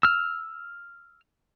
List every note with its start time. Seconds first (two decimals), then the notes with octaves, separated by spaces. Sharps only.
0.03 E6 F6